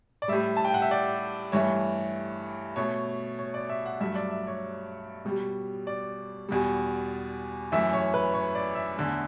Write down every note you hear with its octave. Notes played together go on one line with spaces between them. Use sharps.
D5
A2 G3 E5
A5
G5
F#5
E5
D5
G2 E3 A3 C#5
B2 A3 C#5
C#5
D5
E5
F#5
G2 F#3 A3 E5
D5
E5
C#5
B2 G3
D5
E2 B2 G3
F#2 E3 A3 E5
C#5
B4
C#5
D5
E5
E2 D3 A3